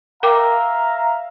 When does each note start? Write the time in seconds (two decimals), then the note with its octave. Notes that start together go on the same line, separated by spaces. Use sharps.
0.23 A#4 E5 F5 G5 A#5 D6